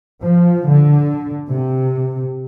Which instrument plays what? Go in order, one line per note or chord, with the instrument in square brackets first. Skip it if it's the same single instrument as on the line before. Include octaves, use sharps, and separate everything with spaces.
[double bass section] F3
D3
C3